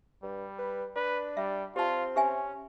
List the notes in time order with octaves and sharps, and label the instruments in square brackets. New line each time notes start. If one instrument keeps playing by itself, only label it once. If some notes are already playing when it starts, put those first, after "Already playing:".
[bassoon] G2 [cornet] G3
[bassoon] B4
[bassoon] D4 [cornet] B4
[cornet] G3 [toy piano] E5
[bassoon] C4 [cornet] F4 [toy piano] G4 A5
[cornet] C#4 [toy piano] G4 E5 G#5